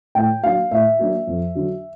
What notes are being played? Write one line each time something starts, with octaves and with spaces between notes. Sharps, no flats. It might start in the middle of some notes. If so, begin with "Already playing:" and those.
A2 G5
F#3 A#3 D4 F5
A2 E5
F#3 A#3 D4
F2
D3 F#3